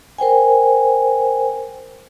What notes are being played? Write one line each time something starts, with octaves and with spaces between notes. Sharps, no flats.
A#4 C5 G5 G#5